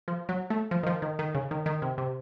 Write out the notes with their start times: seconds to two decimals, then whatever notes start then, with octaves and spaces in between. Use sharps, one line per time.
0.08 F3
0.29 F#3
0.50 A3
0.71 F3
0.83 D#3
0.87 F3
1.02 D#3
1.19 D#3
1.35 C#3
1.51 D#3
1.66 D#3
1.82 C3
1.98 C3